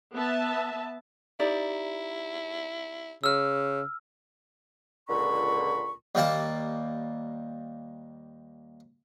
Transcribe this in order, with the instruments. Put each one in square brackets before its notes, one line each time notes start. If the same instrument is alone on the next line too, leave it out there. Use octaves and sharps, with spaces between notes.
[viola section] B3 E5 A5
[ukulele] D#4 G4 D5 [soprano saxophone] E4
[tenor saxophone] C#3 [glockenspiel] E6 F6
[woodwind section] C#2 A#2 D3 B5 C#6
[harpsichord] D#2 G3 A#3 A5